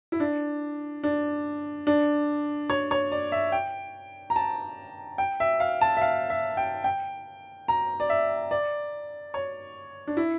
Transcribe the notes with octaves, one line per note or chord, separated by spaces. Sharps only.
E4
D4
D4
D4
C#5
C#5
D5
E5
G5
A#5
A5
G5
E5
F5
A5
E5
F5
E5
G5
G5
A#5
D5
E5
D5
C#5
D4
E4